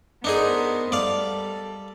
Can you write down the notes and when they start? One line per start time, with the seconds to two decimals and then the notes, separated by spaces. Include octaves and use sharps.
0.24 B3 D4 D#4 G#4 A#4 C5
0.92 G3 A4 D5 F5